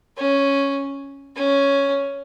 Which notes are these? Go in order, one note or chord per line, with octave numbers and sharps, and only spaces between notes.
C#4
C#4